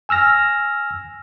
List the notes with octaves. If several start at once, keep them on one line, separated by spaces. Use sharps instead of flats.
G#5 E6 F6 A#6